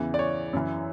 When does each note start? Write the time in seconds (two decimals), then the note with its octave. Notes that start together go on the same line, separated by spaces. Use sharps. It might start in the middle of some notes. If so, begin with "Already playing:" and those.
Already playing: E2 C#3 E3
0.14 D5
0.19 C#5
0.53 F#2 E3